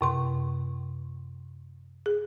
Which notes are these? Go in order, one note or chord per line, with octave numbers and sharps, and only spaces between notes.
F#2 C3 C6
G#4